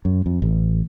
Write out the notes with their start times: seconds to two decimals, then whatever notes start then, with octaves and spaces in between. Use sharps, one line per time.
0.05 F#2
0.26 F2
0.42 A1